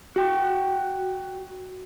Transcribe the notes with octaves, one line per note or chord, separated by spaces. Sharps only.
F#4 G5